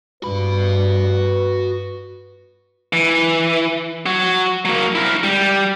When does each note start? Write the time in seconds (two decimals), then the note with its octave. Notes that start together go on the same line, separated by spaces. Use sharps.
0.23 G2 F#4 B4 B5
2.93 E3
4.06 F#4 C#5
4.65 F#3 A#3
4.95 E4 A#4
5.23 G3